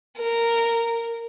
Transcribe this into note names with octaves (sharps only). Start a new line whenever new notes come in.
A#4